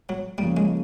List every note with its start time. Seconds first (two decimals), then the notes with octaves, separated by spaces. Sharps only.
0.09 F#3
0.38 C#3 F3 G3 A#3
0.57 G#3